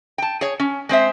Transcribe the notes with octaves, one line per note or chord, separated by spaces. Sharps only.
G5 A5
G#4 C#5
C#4
G#3 C4 C5 E5